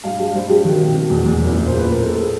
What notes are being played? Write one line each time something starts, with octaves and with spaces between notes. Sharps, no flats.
G2 F5
G3 F5
G2 C5
G3 G4
D#3 F#4
C3
B2
E2
E2
F#1
A#2
C5
A#3
B4
A2 A#4
A3 A4
G#4